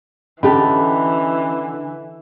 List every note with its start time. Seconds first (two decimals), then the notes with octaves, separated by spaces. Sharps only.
0.43 D3 E3 C#4 G4 D#5 A5 B5